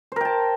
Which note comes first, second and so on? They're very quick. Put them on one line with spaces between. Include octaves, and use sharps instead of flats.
C5 A#4 G5 A5